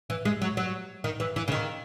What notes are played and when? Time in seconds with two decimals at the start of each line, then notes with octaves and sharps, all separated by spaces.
0.10 E3
0.25 G#3
0.42 F#3
0.57 F#3
1.04 D#3
1.20 E3
1.36 E3
1.48 C#3
1.52 D#3